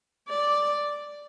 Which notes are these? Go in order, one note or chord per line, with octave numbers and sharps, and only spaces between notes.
D5